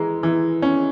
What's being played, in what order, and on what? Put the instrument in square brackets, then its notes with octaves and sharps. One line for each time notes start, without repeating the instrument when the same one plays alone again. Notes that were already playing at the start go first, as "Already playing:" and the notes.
Already playing: [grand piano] E3 G#3 A#5
E3
C#4